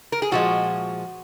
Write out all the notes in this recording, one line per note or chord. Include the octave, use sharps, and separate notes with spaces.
A#4
G#4
A#2 F3 G#3 F#4